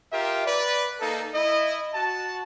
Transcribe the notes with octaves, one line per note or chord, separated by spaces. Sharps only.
F4 G4 A#4 E5
B4 D5
A#3 D#4 A4
E4 D#5
F#4 A5